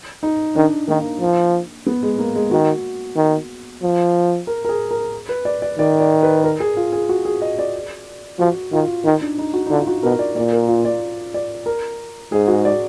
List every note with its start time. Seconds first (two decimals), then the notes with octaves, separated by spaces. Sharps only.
0.23 D#4
0.55 D#3 D4
0.88 D#3 A#3
1.21 F3
1.86 B3
2.03 G#3
2.19 A#3
2.35 G#3
2.51 D#3 F#4
3.17 D#3
3.83 F3
4.47 A#4
4.65 A#4
4.69 G#4
4.91 A#4
5.29 B4
5.45 D5
5.62 D5
5.78 D#3 D5
6.00 D5
6.23 B4
6.44 A#4
6.60 G#4
6.77 F4
6.93 G#4
7.09 F#4
7.25 G#4
7.42 D#5
7.59 D5
8.39 F3 F#4
8.73 D#3 F4
9.05 D#3 D#4
9.21 D4
9.38 D#4
9.54 F#4
9.66 D#4
9.70 D3 F4
9.87 F#4
10.03 B2 A#4
10.19 D5
10.35 A#2 D5
10.52 A#4
10.69 F4
10.85 D5
11.34 D5
11.66 A#4
12.32 G#2 G#4
12.47 F#4
12.65 D5